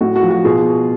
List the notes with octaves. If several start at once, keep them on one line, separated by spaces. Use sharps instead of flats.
A2 F#4
F#4
F3
F#4
B2 F4 G#4